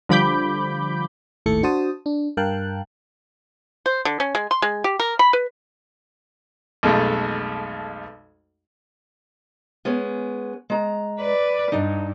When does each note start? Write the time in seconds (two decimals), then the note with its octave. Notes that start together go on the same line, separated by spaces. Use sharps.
0.09 D3 F3 G3 B5 D6 G6
1.46 G#1 D#2 A2 A3 A4 C#7
1.63 D4 F#4 C5 A5 D#6
2.06 D4
2.37 G2 A#4 F5 G5 A5 F#6
3.86 C5
4.05 D3
4.20 C#4
4.35 G#3
4.51 C6
4.62 G#3
4.84 G4
5.00 A#4
5.19 B5
5.33 B4
6.83 B1 F2 G#3 A3
9.85 G#3 B3 C#4
10.70 G#3 A#5
11.20 B4 D5
11.72 G2 D4 D#4